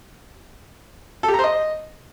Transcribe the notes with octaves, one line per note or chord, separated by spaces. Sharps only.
A4
G4
A#5
C5
D#5